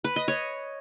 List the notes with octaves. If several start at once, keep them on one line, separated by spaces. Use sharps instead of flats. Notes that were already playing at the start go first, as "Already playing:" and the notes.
B4
D#5
C#5